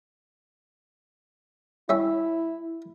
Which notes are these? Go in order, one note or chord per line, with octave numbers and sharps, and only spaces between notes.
G3 C#4 E4 E5